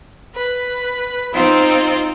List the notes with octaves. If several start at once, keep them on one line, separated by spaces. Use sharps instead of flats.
B4
C4 D#4 F4 C5